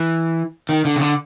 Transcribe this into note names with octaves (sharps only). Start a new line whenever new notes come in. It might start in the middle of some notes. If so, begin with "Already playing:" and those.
Already playing: E3
D#3
D3
C#3
D3